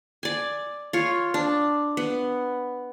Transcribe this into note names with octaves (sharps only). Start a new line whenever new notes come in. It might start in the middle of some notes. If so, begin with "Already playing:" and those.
D5 G#5
F4 C#5
D4
B3